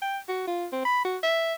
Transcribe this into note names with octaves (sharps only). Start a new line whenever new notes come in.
G5
F#4
F4
C4
B5
F#4
E5